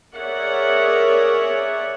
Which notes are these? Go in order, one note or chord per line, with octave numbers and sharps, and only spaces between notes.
G#4 A#4 C#5 D5 E5 F#5